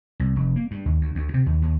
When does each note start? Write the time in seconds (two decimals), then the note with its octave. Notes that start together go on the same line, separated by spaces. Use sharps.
0.20 C2
0.36 F1
0.56 A#3
0.71 G2
0.86 D#2
1.01 D2
1.15 D2
1.34 C3
1.46 D#2
1.62 D#2